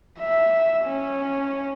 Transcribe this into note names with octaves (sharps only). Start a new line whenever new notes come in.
E5
C#4